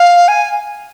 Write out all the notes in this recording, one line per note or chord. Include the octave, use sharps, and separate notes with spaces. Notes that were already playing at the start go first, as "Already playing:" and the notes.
Already playing: F5
G#5